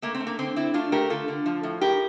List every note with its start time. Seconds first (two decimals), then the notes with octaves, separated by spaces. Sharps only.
0.02 A3 A#3
0.15 C4
0.20 A3
0.27 A#3
0.39 D3 C4
0.56 D3 C4 E4
0.74 A3 D4 F4
0.92 A3 G4 A#4
1.10 D3 F4 A4
1.28 D3
1.46 F3
1.63 A2
1.81 A2 G4 A#4